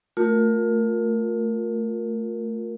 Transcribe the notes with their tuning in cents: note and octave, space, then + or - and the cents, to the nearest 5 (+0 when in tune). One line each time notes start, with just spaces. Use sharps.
A3 +15 F4 +30 A#4 +0